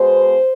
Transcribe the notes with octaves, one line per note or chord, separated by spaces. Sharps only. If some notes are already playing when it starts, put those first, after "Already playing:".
Already playing: B2 G#3 B3 C5